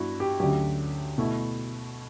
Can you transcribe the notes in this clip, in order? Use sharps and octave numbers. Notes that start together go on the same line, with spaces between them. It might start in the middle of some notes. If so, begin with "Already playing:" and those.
Already playing: G2 B3 D4 E4 F#4
G4
D2 D3 F#3 C#4 G4
B2 A3 E4